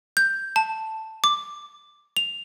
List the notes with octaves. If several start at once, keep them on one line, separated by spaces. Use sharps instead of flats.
G6
A5
D6
F7